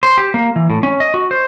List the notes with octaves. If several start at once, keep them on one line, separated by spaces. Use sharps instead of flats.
C5
G4
A#3
E3
A2
C#4
D#5
F#4
C5